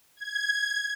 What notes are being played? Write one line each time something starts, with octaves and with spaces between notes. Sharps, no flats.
G#6